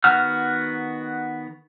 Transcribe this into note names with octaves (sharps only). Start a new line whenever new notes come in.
D#3 B3 F#4 F#5 F6